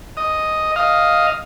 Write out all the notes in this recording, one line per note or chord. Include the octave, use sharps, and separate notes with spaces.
D#5
D#5 F5